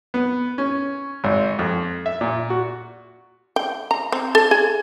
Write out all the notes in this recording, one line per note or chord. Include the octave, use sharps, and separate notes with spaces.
B3
C#4
G#1
F2
E5
A#2
F#4
G5
A#5
C4
A4
G#4